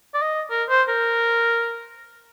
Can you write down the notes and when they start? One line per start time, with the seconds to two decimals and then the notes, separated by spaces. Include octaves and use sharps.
0.14 D5
0.22 D#5
0.50 A#4
0.69 C5
0.89 A#4